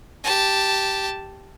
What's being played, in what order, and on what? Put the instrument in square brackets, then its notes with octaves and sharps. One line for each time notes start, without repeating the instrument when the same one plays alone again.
[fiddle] G4 A5